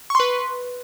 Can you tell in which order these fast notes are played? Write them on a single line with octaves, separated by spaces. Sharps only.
C#6 C6 B4